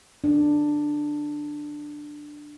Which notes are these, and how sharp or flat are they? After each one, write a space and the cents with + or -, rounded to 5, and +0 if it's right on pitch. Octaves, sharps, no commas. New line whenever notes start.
D4 +10